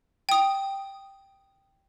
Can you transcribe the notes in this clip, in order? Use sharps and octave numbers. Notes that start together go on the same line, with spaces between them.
G5 D#6